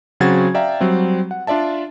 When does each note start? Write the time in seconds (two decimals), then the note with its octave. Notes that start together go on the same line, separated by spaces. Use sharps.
0.20 C#3 F#3 C4 F#4 G#6 A6
0.54 D5 E5 F5 G5 A#5
0.81 F#3 G3 C4
1.31 F#5
1.47 D4 F4 D5 E5 A5